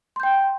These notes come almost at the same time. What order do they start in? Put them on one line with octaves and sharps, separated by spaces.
C6 G6 G5